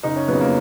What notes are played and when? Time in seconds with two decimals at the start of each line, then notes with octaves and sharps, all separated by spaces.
0.03 F#1 D#4
0.16 C#4
0.28 F2 C#3 F#3 B3
0.41 A#3